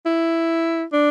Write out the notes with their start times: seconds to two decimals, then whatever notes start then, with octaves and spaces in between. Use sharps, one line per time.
0.06 E4
0.93 D4